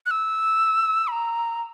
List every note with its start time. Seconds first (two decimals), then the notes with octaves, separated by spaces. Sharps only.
0.06 F#6
0.11 E6
1.08 B5
1.12 A#5